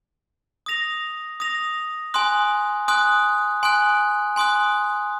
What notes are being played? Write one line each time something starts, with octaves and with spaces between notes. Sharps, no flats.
D#6 A#6 F7
D#6 A#6 F7
G#5 C6 D#6 F#6
G#5 C6 D#6 F#6
G#5 C6 D#6 F#6
G#5 C6 D#6 F#6